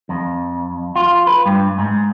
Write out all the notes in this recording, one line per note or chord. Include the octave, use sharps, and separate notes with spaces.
F2
F4
B4
G2
G#2